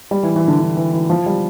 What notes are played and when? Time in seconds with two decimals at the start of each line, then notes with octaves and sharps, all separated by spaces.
0.11 G3
0.23 E3
0.36 E3
0.48 D3
0.60 D3
0.77 E3
0.93 E3
1.10 F3
1.26 G3